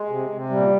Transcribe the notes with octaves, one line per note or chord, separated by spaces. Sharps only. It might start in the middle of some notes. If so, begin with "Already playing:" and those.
Already playing: G#3
C3
C3
A#2 G3